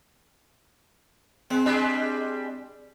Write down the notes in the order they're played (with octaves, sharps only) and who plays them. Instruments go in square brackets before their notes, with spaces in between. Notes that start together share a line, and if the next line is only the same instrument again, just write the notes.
[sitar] G#3 [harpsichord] C4
[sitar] G3 G#3 D4